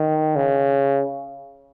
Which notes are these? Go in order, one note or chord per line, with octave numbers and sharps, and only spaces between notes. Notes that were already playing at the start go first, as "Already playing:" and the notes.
Already playing: D#3
C#3